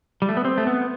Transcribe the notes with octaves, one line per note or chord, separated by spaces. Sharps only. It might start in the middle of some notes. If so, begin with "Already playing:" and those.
G3
A3
B3
C4
A3
B3